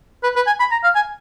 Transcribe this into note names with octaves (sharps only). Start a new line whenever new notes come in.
B4
B4
G#5
B5
A#5
F5
G#5